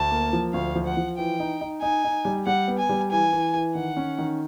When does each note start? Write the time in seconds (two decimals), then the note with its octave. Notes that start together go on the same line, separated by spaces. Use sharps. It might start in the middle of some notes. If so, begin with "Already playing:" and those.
Already playing: D2 A5
0.11 A#3
0.33 F3
0.54 D2 F5
0.75 F3
0.86 F#5
0.97 F3
1.18 E3 G5
1.40 D#4
1.61 D#4
1.82 D#4 G#5
2.04 D#4
2.25 G3
2.47 G3 F#5
2.68 B3
2.79 G#5
2.89 G3
3.11 E3 G#5
3.33 E3
3.54 E3
3.75 D#3 F#5
3.97 C#4
4.19 D#3